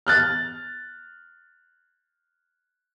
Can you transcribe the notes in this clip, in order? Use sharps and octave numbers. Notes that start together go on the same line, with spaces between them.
F6 F#6 A6